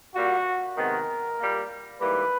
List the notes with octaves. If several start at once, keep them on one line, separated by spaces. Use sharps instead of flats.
A#2 G3 A#3 F#4
C3 D#3 G#3 B3 A#4
A#2 G3 A#3
G#2 E3 G3 A#3 B4